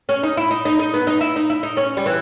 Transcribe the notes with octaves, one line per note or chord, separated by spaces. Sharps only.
C#4
D#4
E4
D#4
D#4
D#4
B3
D#4
E4
D#4
E4
D#4
C#4
G3
E3